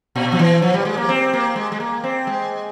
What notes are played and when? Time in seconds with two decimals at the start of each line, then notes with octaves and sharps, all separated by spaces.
0.16 A#2
0.32 F3
0.39 E3
0.62 F3
0.74 G3
0.85 G#3
0.97 A#3
1.09 C4
1.33 A#3
1.56 G#3
1.72 G#3
1.80 A#3
2.04 C4
2.27 G#3